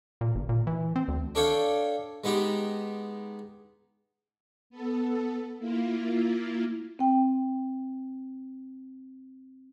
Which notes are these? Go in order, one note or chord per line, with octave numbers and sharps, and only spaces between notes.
A#2
G1
A#2
E3
C4
D2
D4 A4 C#5 F5 G5
G#3 B3 D#4 G4
B3 A4
A#3 E4 F4
C4 G5